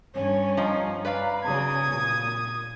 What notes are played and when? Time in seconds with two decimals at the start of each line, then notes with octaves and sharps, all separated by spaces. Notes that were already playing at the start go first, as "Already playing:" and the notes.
0.14 G2 C#4 C#5
0.57 F3 C5 D#5 A#5
1.05 B4 D5 F5
1.44 C#3 F#3 D#6 G#6
1.91 A#2